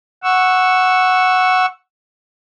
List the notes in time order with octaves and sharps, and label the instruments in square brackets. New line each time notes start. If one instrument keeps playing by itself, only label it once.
[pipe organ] F#5 C#6 E6